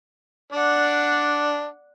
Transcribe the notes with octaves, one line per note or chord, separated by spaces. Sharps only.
D4 D5 F#5